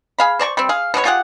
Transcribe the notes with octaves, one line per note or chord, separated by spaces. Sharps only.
G#4 F5 B5
C5 D5 A5 C#6
G3 C4
G#4 F5
B2 B3 C#4 C#5
F4 G4 G#4 F#5